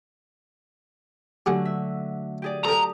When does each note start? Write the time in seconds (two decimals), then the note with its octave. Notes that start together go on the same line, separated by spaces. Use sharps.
1.46 D3 F#3 A3 G4 G#4 F#5
1.65 E5
2.42 G4 G#4 D5
2.65 G4 A4 A#4 A5 A#5 D#6